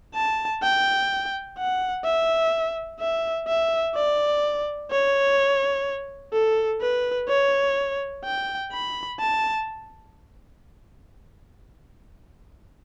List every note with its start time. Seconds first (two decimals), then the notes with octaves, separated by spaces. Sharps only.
0.15 A5
0.63 G5
1.58 F#5
2.05 E5
3.00 E5
3.48 E5
3.95 D5
4.91 C#5
6.33 A4
6.81 B4
7.29 C#5
8.25 G5
8.73 B5
9.20 A5